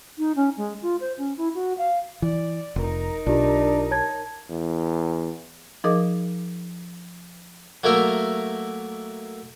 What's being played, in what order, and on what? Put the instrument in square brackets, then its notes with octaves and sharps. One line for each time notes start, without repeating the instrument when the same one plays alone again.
[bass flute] D#4
C#4
G#3
F4
C5
C#4
E4
F#4
F5
[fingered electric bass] E3 [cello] D5
[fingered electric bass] F1 [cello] D#4 A#4
[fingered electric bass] B1 [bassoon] D4 [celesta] F4 G4
[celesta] C#5 A5 G#6
[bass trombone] E2
[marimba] F3 D#4 G#4 A#4 D#5 D6
[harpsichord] F#3 A3 A#3 A#4 E5